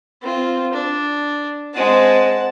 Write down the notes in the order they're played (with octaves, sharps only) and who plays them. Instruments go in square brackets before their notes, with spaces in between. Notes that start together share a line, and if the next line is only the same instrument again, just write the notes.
[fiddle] C4 F4
D4
[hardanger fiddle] G#3 C4 [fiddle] F#5 A5